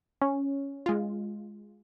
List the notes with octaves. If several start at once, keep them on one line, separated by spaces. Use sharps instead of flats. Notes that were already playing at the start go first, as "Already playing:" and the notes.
C#4
G#3 F4